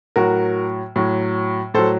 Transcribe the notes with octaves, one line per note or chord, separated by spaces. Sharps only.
A2 F#3 F#4 A#4
A2 F#3
A2 F#3 A4 C5